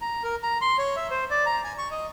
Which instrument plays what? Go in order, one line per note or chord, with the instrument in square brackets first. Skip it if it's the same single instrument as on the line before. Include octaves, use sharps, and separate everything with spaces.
[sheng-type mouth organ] A#5
A#4
A#5
C6
C#5
E5
C5
D5
A#5
G#5
C#6
D#5